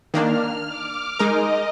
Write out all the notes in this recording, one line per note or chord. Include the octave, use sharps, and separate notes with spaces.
D#3 A#3 D4 F6
D6
G#3 D#4 A#4 D#5